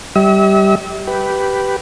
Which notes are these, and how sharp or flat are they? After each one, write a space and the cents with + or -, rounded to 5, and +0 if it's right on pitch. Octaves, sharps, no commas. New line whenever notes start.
G3 -10 E5 -40
G4 -10 B4 +0